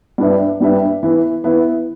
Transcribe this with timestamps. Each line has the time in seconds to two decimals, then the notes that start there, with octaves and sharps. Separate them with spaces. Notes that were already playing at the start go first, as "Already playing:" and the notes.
0.18 G2 G3 D4 B4 E5
0.60 G2 G3 D4 B4 E5
1.03 E3 B3 E4 B4
1.44 E3 B3 E4 B4